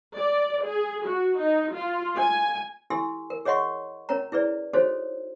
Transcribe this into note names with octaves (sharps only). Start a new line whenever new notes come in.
D5
G#4
F#4
D#4
F4
G#5
E4 G4 A4 G#5 C6 E6
A#4
G#4 C#5 D#5 F#5 C6 C#6
C#4 A#4 C#5 A#5
E4 G#4 B4 D5
D#4 F#4 G#4 A4 C5 C#5